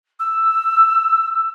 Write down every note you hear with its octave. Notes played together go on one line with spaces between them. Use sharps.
E6